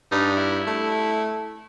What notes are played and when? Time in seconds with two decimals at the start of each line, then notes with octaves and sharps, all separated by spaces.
0.12 G2 D#4
0.36 E4
0.67 A3